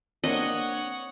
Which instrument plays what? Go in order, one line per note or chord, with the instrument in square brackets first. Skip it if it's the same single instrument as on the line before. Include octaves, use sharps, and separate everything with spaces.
[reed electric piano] A#3 C4 D4 [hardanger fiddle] C#5 F#5 [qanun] D#5